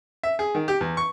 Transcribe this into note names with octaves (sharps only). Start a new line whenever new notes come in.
E5
G#4
D#3
G4
E2
C#6